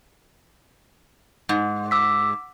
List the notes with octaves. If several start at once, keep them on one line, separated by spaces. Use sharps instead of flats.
G#2
D6 E6 B6